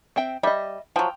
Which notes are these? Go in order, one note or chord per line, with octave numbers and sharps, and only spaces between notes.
C4 E5 G5
G3 D#5 E5
F3 F#3 G5